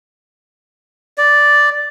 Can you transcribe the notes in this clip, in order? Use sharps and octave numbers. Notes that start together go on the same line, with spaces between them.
D5